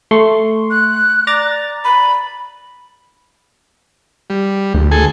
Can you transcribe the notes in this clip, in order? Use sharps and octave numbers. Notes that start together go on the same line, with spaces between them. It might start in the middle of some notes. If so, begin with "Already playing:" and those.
A3 C6 C#6
F#6
D5 A#5 A6
B5
G3
D2
G#4 A4 G#5